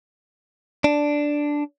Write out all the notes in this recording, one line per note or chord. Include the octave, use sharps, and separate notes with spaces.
D4